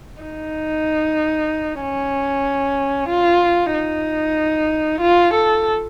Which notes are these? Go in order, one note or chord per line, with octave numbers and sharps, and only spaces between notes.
D#4
C#4
F4
D#4
F4
A4